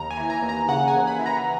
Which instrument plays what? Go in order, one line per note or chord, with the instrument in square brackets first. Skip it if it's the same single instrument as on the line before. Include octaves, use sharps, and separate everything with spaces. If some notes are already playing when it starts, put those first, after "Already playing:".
Already playing: [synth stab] D#2 A#5
G#5
E3
A#5
D#2
A#5
C#3 F#5
G#5
D#2
B5
E3
A#5